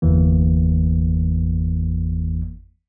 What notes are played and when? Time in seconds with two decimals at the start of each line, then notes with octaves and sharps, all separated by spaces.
0.02 G1 E2 E3 A#3